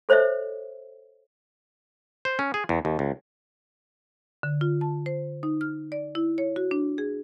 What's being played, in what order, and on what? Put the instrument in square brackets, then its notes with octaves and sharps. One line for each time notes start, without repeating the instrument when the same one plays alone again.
[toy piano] A4 C5 C#5 D#5 E5
[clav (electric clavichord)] C5
C#4
G#4
E2
D#2
C#2
[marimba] D3
F4
A5
C5
D#4
F6
D5
E4
C#5
F#4
D4
G#4